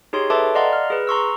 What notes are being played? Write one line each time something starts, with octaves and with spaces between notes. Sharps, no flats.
D#4 G4 G#4 C#5 C6
A4 B4 E5 A5 C6 D6
D5 D#5 F5 F#5 A#5 C6
F6
G#4 B4
A#5 C6 C#6 E6